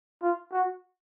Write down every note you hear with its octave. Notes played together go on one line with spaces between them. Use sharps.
F4
F#4